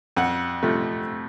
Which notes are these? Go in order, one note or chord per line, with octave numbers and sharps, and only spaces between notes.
F2 F#5
C3 F3 A3